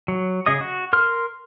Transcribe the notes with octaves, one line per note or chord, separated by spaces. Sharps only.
F#3
C#3 G#4 D#5 D#6
F#4
A#4 C6 F6